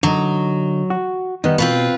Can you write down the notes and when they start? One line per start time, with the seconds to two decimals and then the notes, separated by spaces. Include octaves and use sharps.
0.03 D3 F#3 D#4
0.90 F#4
1.44 D#3 G3 B3 D#4
1.58 B2 C4 F4 B4